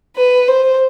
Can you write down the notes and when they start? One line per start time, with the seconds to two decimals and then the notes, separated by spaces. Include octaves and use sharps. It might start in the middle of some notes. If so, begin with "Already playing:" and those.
0.17 B4
0.48 C5